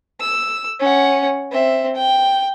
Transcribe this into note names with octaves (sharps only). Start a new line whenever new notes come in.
E6
C#4 F#5
C4 E5
G5